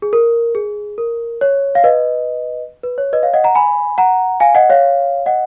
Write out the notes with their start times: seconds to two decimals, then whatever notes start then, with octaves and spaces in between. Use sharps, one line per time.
0.02 G#4
0.13 A#4
0.55 G#4
0.98 A#4
1.41 C#5
1.75 F5
1.84 B4 D#5
2.83 B4
2.98 C#5
3.13 B4 D#5
3.23 C#5 F5
3.34 D#5 F#5
3.44 F#5 A#5
3.55 G#5 B5
3.98 F#5 A#5
4.40 F5 G#5
4.55 D#5 F#5
4.70 C#5 F5
5.26 D#5 F#5